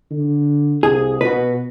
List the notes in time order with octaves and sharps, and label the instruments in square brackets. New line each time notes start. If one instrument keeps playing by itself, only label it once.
[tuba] D3
[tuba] C2 [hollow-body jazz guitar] G#4
[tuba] B2 [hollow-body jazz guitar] F#4 B4